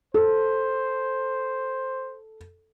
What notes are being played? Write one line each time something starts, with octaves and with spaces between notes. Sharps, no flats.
A4 C5